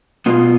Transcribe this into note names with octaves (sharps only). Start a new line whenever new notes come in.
B2 B3 F4